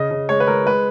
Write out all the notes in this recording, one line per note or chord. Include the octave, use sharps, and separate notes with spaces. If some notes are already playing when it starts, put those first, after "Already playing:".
Already playing: C#3 D#5
C#3
G#3 C#5
B4
G#3 A#4
G#3 B4